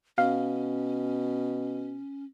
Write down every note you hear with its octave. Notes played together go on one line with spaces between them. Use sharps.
B2 C#4 F5